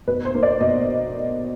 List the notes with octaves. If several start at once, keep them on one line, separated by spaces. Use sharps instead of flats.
B2 B4
C5
A#3
D5
B2 D#5